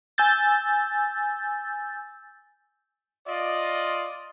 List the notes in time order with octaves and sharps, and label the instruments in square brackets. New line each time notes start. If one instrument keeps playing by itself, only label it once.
[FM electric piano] G#5 E6 G6 A6
[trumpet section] F4 D5 D#5